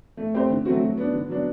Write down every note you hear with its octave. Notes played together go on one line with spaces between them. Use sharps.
A3
C4 G4 C5
D3
F#3 A3 C4 F#4
F#3
B3 D4
D3
F#3 B3 D4